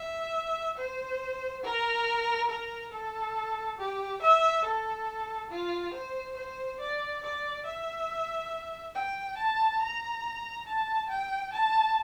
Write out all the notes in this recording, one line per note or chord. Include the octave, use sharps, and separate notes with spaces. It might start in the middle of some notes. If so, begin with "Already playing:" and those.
Already playing: E5
C5
A#4
A#4
A4
G4
E5
A4
F4
C5
C5
D5
D5
E5
G5
A5
A#5
A5
G5
A5